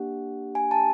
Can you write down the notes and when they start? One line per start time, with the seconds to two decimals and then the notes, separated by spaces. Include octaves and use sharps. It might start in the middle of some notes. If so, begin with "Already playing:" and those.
Already playing: A#3 D4 G4 F#5
0.55 G#5
0.71 A5